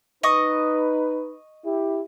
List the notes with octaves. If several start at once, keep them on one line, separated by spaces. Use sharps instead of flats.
D#4 B4 D#5 C#6 D#6
E4 G4